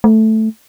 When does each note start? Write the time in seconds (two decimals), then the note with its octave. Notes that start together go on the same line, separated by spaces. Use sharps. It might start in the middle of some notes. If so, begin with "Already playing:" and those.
0.04 A3